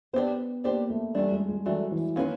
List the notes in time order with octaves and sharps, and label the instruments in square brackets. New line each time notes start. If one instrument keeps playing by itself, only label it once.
[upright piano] B3 [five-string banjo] D4 G4 C5
[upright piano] A#3 [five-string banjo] D4 G4 C5
[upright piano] A3
[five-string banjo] E3 A3 D4 [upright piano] G3
[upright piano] G#3
G#3
[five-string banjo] E3 A3 D4 [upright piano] F#3
[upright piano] E3
[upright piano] D#3 [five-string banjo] A#3 C#4 F4 G#4 B4